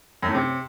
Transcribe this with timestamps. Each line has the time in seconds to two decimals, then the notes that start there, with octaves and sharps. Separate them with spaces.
0.23 F#2
0.29 A2
0.35 C3